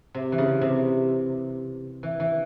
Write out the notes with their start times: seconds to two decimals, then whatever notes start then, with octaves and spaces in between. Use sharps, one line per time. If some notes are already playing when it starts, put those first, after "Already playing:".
0.14 C3
0.32 E3
0.38 C#3
0.61 C3
2.03 E3
2.20 E3